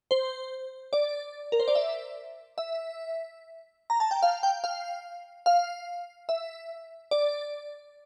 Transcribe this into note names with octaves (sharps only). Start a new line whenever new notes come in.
C5
D5
A#4
C5
D5
E5
E5
A#5
A5
G5
F5
G5
F5
F5
E5
D5